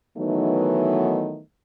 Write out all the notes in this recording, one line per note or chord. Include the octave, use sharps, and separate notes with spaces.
D#3 E3 F#3 A3 B3 D#4